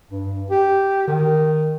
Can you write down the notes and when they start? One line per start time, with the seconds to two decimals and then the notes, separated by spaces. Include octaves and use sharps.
0.10 G2
0.50 G4
1.08 D#3